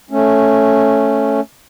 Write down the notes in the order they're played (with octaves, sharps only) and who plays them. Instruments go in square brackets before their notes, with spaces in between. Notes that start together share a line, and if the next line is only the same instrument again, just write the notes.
[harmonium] A3 C#4